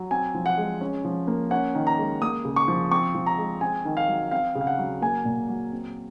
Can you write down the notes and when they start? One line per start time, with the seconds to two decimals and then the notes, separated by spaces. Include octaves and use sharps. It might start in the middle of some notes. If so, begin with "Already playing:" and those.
Already playing: F#3
0.11 C4 G#5
0.35 F3
0.46 F#5
0.58 G#3
0.81 C#4
1.05 F3
1.27 A#3
1.51 C#4 F#5
1.75 D#3
1.87 A#5
1.98 G#3
2.22 A#3 D#6
2.45 C#3
2.56 C#6
2.68 F3
2.91 C4 C#6
3.15 F3
3.26 A#5
3.38 G#3
3.61 C4 G#5
3.85 D#3
3.97 F5
4.08 F#3
4.31 C4 F5
4.55 C#3
4.61 F5
4.67 F#5
4.79 F#3
5.02 A#3 G#5
5.25 A#2
5.48 F#3
5.72 C4